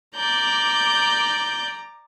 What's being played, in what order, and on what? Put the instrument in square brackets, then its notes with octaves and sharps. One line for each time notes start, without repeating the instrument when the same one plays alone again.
[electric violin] D5 G6 [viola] A#5 D6